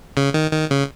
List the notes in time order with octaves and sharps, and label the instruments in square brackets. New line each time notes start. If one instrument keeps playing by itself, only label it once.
[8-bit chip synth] C#3
D#3
D#3
C#3